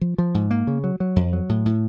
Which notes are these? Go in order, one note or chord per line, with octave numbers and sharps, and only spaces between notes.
F3
F3
G#2
A#3
C#3
F#3
F#3
F2
F#3
A2
A2